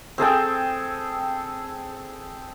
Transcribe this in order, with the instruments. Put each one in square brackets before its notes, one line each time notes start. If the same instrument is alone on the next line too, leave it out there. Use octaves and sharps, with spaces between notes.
[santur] C4 G#4 A4 G5